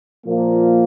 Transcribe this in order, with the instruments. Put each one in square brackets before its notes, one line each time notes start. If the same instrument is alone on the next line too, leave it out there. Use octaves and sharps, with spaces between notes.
[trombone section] A#2 F3 A#3